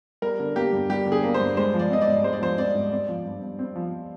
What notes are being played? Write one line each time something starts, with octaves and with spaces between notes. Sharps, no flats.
G3 A#4
D3
A#3 G4
G2
G3 G4
D3
G#4
A#3
C5
G2
G#3 C5
F3
D5
C4 D#5
D5
G#2
G#3 C5
D5
F3 C5
C4 D5
G#2
C4 D5
F3
G2
G2
C4
F3